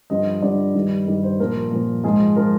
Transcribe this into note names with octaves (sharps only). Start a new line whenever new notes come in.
G2 D3 F3 D#5
G2 D3 F3 D5
G2 D#3
G2 D#3
C5
A#2 F3 A#4
A#2 F3
G#2 F3 G#4
F3 A#4